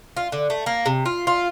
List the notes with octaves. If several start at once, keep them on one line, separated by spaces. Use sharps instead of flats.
F4
D3
A3
A#3
C3
F4
F4